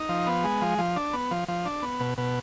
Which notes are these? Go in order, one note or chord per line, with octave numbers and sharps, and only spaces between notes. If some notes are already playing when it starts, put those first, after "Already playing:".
Already playing: D#4
F3
B3
G#3
F3
F3
D4
B3
F3
F3
D4
B3
B2
B2